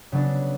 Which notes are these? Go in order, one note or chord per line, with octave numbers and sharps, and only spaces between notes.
C#3 F#3 B3 D4